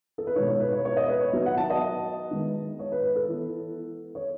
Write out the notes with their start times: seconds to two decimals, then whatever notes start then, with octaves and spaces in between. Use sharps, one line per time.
0.18 A4
0.27 B4
0.36 B2 G#3 B3 D#4 C#5
0.48 C#5
0.60 B4
0.72 C#5
0.85 C#5
0.97 D#5
1.08 B4
1.21 C#5
1.33 F#3 B3 D#4 E5
1.46 F#5
1.58 A5
1.70 D#5
2.31 D#3 G#3 B3
2.79 C#5
2.92 B4
3.03 B4
3.16 A4
3.28 E3 B3 E4
4.15 C#5